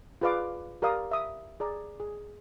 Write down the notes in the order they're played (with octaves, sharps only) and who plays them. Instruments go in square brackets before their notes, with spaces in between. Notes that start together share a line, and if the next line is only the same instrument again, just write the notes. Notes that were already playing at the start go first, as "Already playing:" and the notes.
[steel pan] F4 G#4 B4 D5 F5 D6
G4 A#4 D5 F5 D#6
E5 D#6
G#4 D5 A#5
G#4